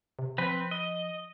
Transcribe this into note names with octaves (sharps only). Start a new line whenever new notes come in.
C3
F3 C4 B4
D#5